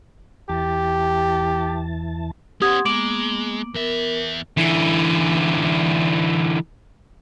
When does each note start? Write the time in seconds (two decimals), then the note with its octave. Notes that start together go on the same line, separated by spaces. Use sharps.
0.49 E2 E3 G4 A5
2.62 B3 C#4 G4 F#5 C6 D#6 G#6
2.85 G#3 A#3 B3 D6 D7 F#7
3.74 E2 B3 A#4 E5
4.57 D3 E3